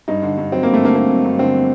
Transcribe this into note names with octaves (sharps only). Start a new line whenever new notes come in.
G2 D#4
D3
G2
F#3 C4
A#3
G2
A3
D3 A#3
G2 A#3
F#3
G2
D3 C4